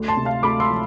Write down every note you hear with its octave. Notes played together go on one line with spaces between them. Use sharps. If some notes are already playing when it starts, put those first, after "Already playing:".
Already playing: D2
A5 C6
C3
F5 A5
D2 B5 D6
C6 E6
F3